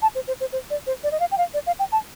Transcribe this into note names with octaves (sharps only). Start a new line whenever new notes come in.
A5
C5
C5
C5
C5
D5
C5
D5
D#5
F5
G5
F5
D5
F5
G5
A5